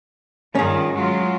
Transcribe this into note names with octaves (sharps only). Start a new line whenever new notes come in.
G2 D#3 C#4 F4 G#4
F#3 G#3 F4